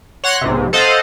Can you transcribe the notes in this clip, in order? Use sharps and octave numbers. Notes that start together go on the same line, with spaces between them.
C#5 F#5 C6 F#6 A#6
B1 G#2 C3
A4 C5 D#5 F5 F#5